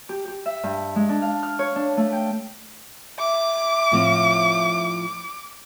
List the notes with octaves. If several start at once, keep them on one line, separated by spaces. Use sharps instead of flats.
G4
G4
E5
G2
G#3
D4
F5
F6
C#5
D4
A3
G5
E5 D6
A2 F3 C4